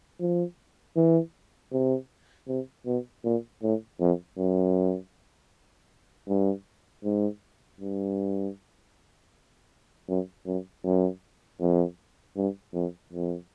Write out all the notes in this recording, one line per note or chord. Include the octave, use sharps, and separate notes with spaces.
F3
E3
C3
C3
B2
A#2
A2
F2
F#2
G2
G#2
G2
F#2
F#2
F#2
F2
G2
F2
F2